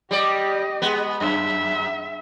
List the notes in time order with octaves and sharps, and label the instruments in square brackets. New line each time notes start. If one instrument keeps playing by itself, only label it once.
[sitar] G3 D5 [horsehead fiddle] G4 D#5
[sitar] G#3 B3
[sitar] F#2 [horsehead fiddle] E5